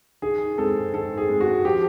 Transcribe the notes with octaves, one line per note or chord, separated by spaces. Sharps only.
D#3 G#4
G#3 C4 A4
D#3 A4
G#4
G#3 C4
F#4
F3 G4